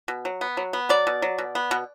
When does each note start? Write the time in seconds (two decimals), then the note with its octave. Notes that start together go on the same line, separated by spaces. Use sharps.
0.08 B2
0.25 F#3
0.41 B3
0.57 F#3
0.73 B3
0.89 F#3 D5
1.07 B2
1.22 F#3
1.38 B2
1.55 B3
1.71 B2